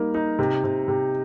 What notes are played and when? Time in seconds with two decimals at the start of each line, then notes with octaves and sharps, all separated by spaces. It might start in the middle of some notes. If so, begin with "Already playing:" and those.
Already playing: G3 A#3 D#4
0.15 D#4
0.39 C3
0.64 C3
0.88 C3